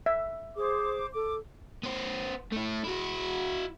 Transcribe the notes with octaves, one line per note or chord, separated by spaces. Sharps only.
E5
G#4 C5 D6
A4 D6
B3 C5
A3 E4
E4 F#4